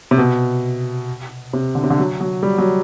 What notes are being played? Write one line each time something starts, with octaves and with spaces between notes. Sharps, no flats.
C3
B2
C3
D3
C3
D3
F#3
F#3
G3
F#3